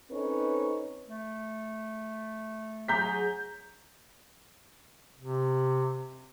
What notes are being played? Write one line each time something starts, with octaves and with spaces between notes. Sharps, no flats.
C4 C#4 D#4 A4 B4 C#5
A3
F#3 G#4 A#5 G6 B6
C3